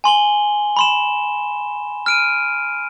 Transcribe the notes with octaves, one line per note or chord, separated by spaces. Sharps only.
G#5 C6 F#7 G7
B5 C6 E7
F6 D7 D#7